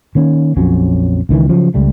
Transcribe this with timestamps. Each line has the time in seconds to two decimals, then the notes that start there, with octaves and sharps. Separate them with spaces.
0.15 D#3 A#3 C#4
0.57 A#1 F2 F#3 C#4
1.29 C#2 D#3 E3
1.49 C#3 F3 F#3
1.74 C#2 G3 A3